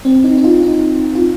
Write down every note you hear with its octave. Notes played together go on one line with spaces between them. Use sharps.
C4
D#4
D#4
F4
D#4
F4